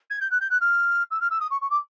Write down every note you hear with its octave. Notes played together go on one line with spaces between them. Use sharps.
G#6
G6
F#6
G6
F#6
F6
E6
F6
E6
D#6
C#6
C#6
D6